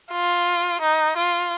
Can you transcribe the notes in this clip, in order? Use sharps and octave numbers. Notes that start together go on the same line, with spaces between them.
F4
D#4
F4